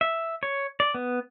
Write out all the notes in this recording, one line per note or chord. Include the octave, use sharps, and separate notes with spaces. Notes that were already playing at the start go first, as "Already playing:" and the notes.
E5
C#5
D5
B3